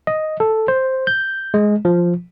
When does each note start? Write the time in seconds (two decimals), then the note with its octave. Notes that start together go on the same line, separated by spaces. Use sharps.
0.07 D#5
0.40 A4
0.68 C5
1.07 G6
1.54 G#3
1.85 F3